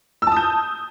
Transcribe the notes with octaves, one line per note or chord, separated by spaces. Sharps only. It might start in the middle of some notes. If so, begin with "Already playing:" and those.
A5 D#6 E6 G6